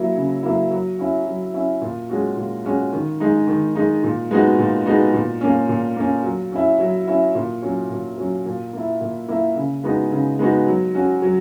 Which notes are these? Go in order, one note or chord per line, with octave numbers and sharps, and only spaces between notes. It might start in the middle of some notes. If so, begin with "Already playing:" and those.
Already playing: F#3 A#3 E4
C#3
F#3 A#3 E4
F#3
C#4 E4
F#3
C#4 E4
A#2
G#3 C#4 F#4
A#2
G#3 C#4 F#4
D#3
G#3 D#4
D#3
G#3 D#4
A#2
G#3 B3 D#4 F#4
A#2
G#3 B3 D#4 F#4
A#2
A#3 C#4
A#2
A#3 C#4
F#3
C#4 E4
F#3
C#4 E4
A#2
F#3 C#4
A#2
F#3 C#4
A#2
A#3 E4
A#2
A#3 E4
C#3
G#3 B3 D#4 F#4
C#3
G#3 B3 D#4 F#4
F#3
C#4 F#4
F#3